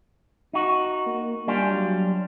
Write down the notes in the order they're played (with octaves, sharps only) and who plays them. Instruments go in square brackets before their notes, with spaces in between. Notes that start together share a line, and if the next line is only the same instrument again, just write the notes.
[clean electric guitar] D#4 F#4
[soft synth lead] A#3
[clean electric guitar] G3 D4 F4 [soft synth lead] G#5
[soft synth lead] F#3